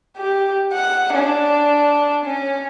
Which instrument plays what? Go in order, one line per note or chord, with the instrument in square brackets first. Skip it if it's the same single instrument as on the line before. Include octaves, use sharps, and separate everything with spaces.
[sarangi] G4
F#5
D4
C#4